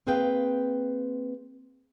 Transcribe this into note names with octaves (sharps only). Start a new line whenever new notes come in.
A#3 C4 G#4 B4 F5 G5